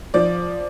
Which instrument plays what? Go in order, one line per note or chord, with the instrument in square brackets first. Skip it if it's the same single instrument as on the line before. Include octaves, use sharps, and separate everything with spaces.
[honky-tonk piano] F3 D5